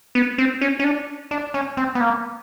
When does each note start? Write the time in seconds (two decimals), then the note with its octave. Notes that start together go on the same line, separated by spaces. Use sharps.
0.15 B3
0.38 C4
0.61 C#4
0.79 C#4
0.84 D4
1.31 D4
1.54 C#4
1.77 C4
1.95 B3
2.01 A#3